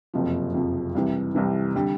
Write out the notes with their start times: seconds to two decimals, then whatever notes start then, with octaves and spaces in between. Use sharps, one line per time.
0.14 F#1 F2 C3 F3
0.54 F#1 F2 C3 F3
0.95 C2 C3 E3
1.35 C2 C3 E3
1.76 D3 G3